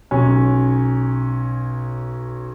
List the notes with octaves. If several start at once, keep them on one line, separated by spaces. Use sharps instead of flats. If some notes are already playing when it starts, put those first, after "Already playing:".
B1 C#4